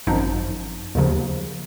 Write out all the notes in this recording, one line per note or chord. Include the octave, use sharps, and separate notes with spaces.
G#1 F#2 F3 D#4
D#2 C#3 F3